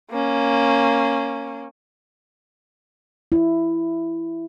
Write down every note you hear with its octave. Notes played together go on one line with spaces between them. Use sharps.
A#3 C#4
E4